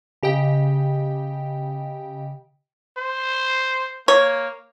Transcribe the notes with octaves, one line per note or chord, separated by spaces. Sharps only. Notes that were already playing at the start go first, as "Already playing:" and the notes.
C#3 G4 D#5 G5
C5
A#3 C#5